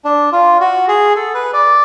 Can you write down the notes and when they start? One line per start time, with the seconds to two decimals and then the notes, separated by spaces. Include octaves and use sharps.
0.05 D4
0.32 F4
0.61 F#4
0.88 G#4
1.16 A4
1.34 B4
1.53 D5